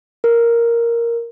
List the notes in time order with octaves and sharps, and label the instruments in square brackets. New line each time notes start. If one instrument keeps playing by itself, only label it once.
[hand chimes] A#4